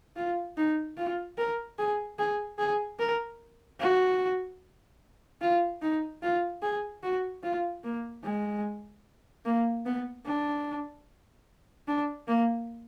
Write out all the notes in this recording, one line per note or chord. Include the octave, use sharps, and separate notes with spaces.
F4
D#4
F4
A#4
G#4
G#4
G#4
A#4
F#4
F4
D#4
F4
G#4
F#4
F4
A#3
G#3
A#3
B3
D4
D4
A#3